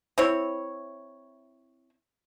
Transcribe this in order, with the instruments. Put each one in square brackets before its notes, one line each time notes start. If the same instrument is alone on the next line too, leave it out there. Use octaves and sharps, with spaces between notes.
[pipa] C4 E4 C#5